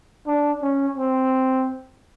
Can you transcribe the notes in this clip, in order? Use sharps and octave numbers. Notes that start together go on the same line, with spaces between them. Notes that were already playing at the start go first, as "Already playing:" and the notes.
D4
C#4
C4